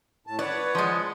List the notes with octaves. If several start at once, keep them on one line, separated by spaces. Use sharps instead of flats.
A2 A5
B4 C#5 D5 F#5
F3 G#3